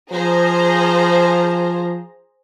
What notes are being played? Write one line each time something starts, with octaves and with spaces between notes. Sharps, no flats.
F3 G#4 C5 A#5